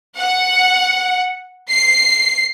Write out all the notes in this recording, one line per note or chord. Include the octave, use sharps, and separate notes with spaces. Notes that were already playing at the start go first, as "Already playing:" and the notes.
F#5
C7